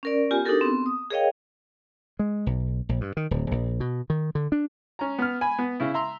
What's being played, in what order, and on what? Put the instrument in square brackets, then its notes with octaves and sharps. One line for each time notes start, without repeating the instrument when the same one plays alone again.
[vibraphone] C#4 A#4 D5
B3 F4 G4 G#5
D4 D#4 F#4 G4 A4 A#4
B3 C4
D#6
G#4 A#4 C#5 D#5 F5 G5
[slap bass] G#3
B1
A#1
G2
D#3
D1
A#1
B2
D#3
D3
D4
[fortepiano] C#4 A#5
B3 F6
G#5 B5
B3
C#3 E4
E5 A#5 C6